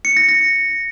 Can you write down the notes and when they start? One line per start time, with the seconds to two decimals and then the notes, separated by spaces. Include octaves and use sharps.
0.05 C#7
0.17 A#6
0.29 A#6